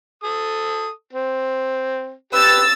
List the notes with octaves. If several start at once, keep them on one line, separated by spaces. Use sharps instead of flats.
A4 D#6
C4
G4 B4 E6 A6